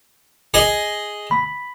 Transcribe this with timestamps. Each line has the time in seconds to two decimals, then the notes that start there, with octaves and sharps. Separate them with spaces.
0.54 G#4 D#5
1.31 B5